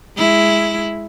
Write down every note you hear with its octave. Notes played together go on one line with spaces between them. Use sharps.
G#3 E4